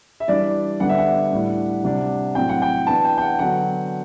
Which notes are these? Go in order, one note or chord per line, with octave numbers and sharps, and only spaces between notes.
E5
E3 G3 D4 D5
D3 G3 B3 D4 F#5
E5
F#5
A2 G3 D4
C3 G3 D4
A2 F#3 C4 G5
F#5
G5
E3 B3 D4 A5
G5
G5
F#5
D3 F#3 B3 D4 F#5